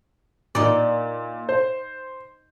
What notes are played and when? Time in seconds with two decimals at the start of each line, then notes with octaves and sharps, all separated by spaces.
0.55 A#2 D#4 D5
1.49 C5